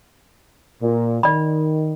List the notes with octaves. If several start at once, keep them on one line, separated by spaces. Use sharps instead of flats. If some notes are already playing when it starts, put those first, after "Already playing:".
A#2
D#3 D5 B5